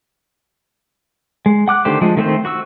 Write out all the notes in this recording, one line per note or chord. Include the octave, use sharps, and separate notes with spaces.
G#3
F#5 D6 F#6
D3 D#3 A3 G4 C5
F3 G#3
D#3 A3 C4 C5
F#4 C#6 E6